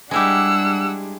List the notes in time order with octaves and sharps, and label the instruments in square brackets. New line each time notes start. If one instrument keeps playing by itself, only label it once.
[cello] G3 D4 [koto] G#3 E4 G4 [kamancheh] F#5 E6